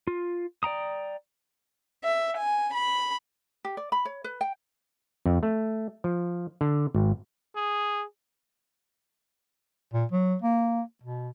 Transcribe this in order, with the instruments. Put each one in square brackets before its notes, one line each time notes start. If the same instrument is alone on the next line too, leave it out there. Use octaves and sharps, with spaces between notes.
[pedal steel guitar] F4
D5 G5 A#5 D#6
[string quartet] E5
G#5
B5
[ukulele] G4
D5
B5
C#5
B4
G5
[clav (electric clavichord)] F2
A3
F3
D3
G#1
[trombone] G#4
[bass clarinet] A#2
F#3
A#3
B2